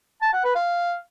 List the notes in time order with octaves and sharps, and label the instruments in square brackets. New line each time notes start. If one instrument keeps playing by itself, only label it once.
[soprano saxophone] A5
F#5
B4
F5